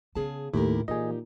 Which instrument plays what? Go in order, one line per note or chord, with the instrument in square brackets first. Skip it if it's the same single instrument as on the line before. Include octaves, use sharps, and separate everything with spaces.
[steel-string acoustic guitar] C#3 G#4 A5 [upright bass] B3
[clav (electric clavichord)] D#2 [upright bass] A2 [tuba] A3 [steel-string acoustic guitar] E4 G4 A#4
[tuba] A#2 [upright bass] E3 [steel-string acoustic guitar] D#4 G4 [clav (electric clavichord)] G#4 D#5